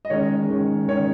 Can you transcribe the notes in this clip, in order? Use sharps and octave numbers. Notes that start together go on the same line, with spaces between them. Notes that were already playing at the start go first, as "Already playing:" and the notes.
D#5
D#3 G#3 C#4 C#5
D#3 G#3 C#4
D#3 G#3 C#4 C#5